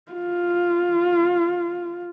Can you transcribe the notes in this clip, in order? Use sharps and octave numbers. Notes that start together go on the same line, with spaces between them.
F4